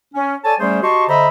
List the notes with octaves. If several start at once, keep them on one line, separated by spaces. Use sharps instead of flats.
C#4
A4 C#5 D5 G#5 A5
G3 A3 C#4 G#4 C5
F#4 G4 D#5 A5 C6 C#6
D3 C5 D#5 E5 A#5 B5